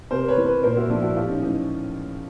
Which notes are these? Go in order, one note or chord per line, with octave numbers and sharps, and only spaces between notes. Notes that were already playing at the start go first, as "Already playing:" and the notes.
C3 A#4 C5
B4 C#5
E3
B4 C#5
A#2 A#4 C5
E4 F#4
F3 D4 E4
E4 F#4
A2 F4 G4
C#4 D#4
E3 C#4 D#4